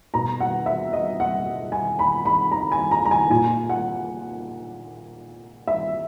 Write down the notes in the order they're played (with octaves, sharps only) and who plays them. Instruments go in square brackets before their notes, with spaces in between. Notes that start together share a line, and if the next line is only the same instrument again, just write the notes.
[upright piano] B2 A#5
F#5
E5
D#5
F#5
G#5
B5
B5
A#5
G#5
A#5
A#5
G#5
A#2 G#5
F#5
E5